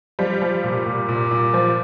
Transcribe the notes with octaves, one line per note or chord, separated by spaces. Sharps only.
F3 G3
F3
A#2
A#2
A#2
A#2
F3